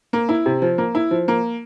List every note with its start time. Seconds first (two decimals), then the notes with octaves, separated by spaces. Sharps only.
0.13 A#3
0.29 E4
0.46 C3
0.62 F3
0.78 A#3
0.95 E4
1.11 F3
1.28 A#3